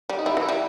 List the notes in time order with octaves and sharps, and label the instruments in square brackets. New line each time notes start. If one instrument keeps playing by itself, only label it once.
[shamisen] G3
[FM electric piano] D#4
[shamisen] G3 [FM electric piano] E4
[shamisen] E3
[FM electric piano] E4
[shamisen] G3